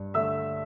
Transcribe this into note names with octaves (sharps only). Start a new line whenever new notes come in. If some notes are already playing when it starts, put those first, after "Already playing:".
Already playing: G2
D3 A3 E5 E6